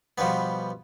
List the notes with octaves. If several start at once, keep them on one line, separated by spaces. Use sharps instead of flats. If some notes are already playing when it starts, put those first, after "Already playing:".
B2 F3 G3 B3